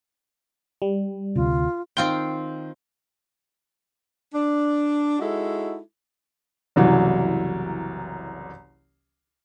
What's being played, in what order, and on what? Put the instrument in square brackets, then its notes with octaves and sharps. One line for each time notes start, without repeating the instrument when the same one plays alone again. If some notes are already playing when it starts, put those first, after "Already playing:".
[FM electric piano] G3
[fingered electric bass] D2 C3 [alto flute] F4
[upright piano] D#3 G7 [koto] C4 F4 G5
[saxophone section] D4
G#3 D#4 E4 F#4 A4
[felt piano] F#1 C2 E3 F#3